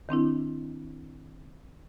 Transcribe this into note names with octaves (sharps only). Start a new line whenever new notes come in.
D#3 C4 D4 E4